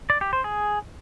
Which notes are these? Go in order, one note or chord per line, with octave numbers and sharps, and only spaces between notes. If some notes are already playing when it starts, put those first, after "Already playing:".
D5
G4
C5
G#4